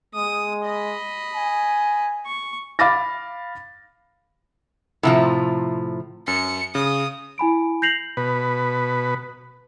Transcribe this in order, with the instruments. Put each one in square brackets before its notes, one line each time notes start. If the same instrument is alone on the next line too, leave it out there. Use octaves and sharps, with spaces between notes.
[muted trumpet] G#3 [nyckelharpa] D#6
[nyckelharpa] D#5 B5
[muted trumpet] G#5
[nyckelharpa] C#6
[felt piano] F5 B5 D6 A6 A#6
[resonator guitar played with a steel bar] A2 C3 F3
[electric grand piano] F#2 [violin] C#7
[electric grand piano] C#3 [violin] D#6
[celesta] E4 G#5 B5 D7
G6 A#6 C7 F7 F#7
[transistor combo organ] B2 B4